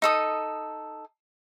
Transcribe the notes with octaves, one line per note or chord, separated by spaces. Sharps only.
D#4 A4 D#6